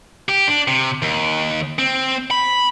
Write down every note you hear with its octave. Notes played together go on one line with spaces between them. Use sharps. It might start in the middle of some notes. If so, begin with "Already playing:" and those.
G4
D4
C3
D#2
C4
B5